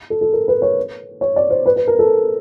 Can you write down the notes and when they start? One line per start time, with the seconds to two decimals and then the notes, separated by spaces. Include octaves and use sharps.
0.10 A4
0.21 A4
0.33 A#4
0.48 B4
0.62 C#5
1.21 C#5
1.36 D5
1.50 C5
1.66 B4
1.76 B4
1.88 A#4
1.99 A4